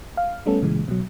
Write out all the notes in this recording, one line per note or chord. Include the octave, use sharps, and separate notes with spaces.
F5
G3 A3 B3 C#4 A4
A#2 C#3 E3 G#3
B2 F#3